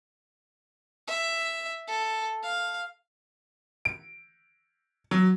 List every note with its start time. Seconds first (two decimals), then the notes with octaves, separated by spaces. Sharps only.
1.08 E5
1.88 A4
2.43 F5
3.85 D7
5.11 F#3